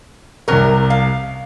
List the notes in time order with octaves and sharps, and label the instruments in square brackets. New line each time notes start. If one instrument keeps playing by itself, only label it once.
[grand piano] C2 C3 [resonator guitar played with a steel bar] F#3 A#4
[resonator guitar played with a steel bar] F5